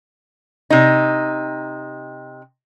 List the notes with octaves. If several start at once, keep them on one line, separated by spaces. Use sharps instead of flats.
C3 D#4